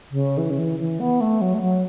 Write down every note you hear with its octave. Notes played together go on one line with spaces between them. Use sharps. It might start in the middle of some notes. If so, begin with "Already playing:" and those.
C#3
E3
C#3
E3
E3
B3
A3
F#3
A3
F#3